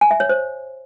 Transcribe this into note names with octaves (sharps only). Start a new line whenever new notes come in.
G#5
E5
C#5
C5